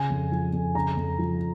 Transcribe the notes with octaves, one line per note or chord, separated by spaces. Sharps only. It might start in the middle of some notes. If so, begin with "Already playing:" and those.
Already playing: C#3 G#5
F2
F3
F2
C#3 A#5
F2
F3